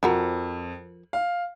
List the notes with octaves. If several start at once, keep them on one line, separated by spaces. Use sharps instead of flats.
F2 F3 F#4 A#4
F5